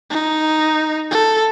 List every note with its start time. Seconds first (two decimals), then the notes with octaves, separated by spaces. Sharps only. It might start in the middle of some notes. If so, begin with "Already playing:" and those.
0.10 D#4
1.11 A4